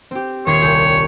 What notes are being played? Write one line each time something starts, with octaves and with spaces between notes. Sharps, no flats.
C4 G4
D#1 C#5 C6 G#6
C2 G#4 G6